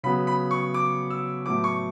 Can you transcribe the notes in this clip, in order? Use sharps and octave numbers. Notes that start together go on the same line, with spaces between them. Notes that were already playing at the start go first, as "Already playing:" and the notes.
C#3 F#3 B3 B5
B5
C#6
D6
E6
A2 F#3 B3 D6
C#6